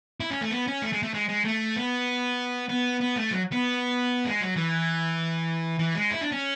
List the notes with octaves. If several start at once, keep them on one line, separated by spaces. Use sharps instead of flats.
E4
C#4
A3
B3
C#4
A3
G#3
A3
G#3
G#3
A3
B3
B3
B3
A3
F#3
B3
G#3
F#3
E3
E3
G#3
E4
D4
C#4